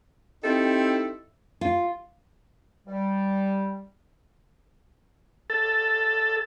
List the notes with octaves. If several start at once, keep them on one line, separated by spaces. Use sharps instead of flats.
C4 D#4 E4 G4 A4
F4
G3
A4